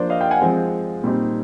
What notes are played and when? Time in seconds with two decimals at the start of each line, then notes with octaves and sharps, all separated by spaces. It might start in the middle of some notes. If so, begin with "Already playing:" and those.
Already playing: F3 A#3 D4 C5 D5
0.10 D#5 F5
0.21 F5 G5
0.31 F#5 G#5
0.41 F3 G#3 C4
1.04 A#2 G3 C4 D#4